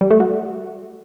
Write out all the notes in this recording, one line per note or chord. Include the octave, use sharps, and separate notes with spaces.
G3
A3
F#4